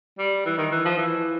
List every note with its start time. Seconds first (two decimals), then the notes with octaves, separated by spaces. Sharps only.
0.18 G3
0.46 E3
0.58 D#3
0.72 E3
0.85 F3
0.98 E3